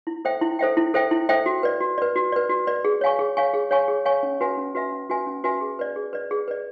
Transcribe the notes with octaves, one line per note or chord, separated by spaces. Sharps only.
E4
A4 C5 E5 G5
E4
A4 C5 E5 G5
E4
A4 C5 E5 G5
E4
A4 C5 E5 G5
F#4
B4 D5
F#4
B4 D5
F#4
B4 D5
F#4
B4 D5
G#4
C#5 F5 G#5 C#6
G#4
C#5 F5 G#5 C#6
G#4
C#5 F5 G#5 C#6
G#4
C#5 F5 G#5 C#6
C#4
F#4 B4 E5 G#5
C#4
F#4 B4 E5 G#5
C#4
F#4 B4 E5 G#5
C#4
F#4 B4 E5 G#5
G#4
B4 D5
G#4
B4 D5
G#4
B4 D5